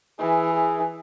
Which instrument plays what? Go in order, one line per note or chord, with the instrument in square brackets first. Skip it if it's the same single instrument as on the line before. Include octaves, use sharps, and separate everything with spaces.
[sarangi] E3 [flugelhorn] G#4
[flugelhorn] G#4